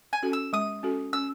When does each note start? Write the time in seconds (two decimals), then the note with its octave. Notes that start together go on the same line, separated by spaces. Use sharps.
0.13 G#5
0.23 C#4 F#4 A4
0.33 E6
0.53 G#3 D#6
0.83 C#4 F#4 A4
1.13 C#4 E6